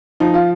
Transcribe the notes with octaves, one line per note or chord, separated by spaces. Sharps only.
F3 D#4
F4